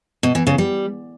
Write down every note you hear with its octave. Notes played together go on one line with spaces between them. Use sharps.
B2
E3
C#3
G3